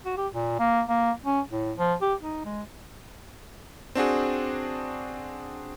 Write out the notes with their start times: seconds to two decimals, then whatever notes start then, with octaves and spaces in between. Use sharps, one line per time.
0.05 F#4
0.17 G4
0.33 A#2
0.59 A#3
0.88 A#3
1.25 C#4
1.51 A2
1.78 F3
2.02 G4
2.21 D#4
2.45 G#3
3.95 C4 D4 F#4 G#4